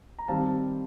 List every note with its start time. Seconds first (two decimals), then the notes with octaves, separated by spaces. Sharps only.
0.19 A#5
0.28 D#3 G3 C4 F5 A5